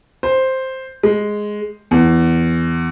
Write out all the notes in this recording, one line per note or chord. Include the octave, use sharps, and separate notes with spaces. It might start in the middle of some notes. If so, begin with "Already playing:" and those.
C5
G#3
E2